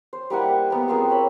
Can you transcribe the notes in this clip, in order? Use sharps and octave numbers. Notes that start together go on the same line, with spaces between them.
C5
G3 A#3 E4 F#5
A#3 B3
F3 A#3 C4 G#4
C#5 E5 B5